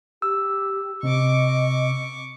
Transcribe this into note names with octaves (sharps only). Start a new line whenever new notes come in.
G4 E6
C3 C4 D#5 C#6 D6